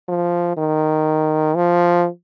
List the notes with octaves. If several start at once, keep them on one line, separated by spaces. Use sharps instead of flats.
F3
D#3
F3